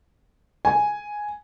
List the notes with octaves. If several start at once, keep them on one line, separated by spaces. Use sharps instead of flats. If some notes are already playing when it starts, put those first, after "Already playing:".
G#5